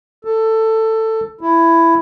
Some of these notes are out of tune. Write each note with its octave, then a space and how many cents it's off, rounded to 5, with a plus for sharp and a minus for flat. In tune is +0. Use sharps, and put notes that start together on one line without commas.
A4 +15
E4 +10